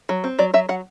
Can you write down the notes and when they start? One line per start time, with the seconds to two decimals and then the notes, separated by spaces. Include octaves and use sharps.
0.09 F#3
0.24 C4
0.39 F#3 D5
0.54 F#3 E5
0.69 F#3 F#5